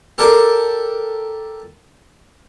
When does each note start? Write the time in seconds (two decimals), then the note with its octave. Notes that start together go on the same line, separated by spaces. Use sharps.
0.18 G4 A4 A#4 D5 G5